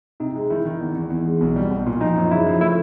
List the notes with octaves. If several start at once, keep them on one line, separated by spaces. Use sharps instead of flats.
C3 D#4
G#3
D#3 E4
D#3
E2
E2
E2
G#3
B1
G3
B1
A#2
F3 D#4
F#2
C#3 E4
F3
A3 E4